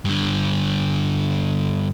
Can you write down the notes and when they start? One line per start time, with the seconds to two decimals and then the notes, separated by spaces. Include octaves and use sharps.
0.05 G2 D3